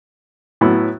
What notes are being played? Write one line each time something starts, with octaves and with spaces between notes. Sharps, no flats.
A2 F#3 B3 E4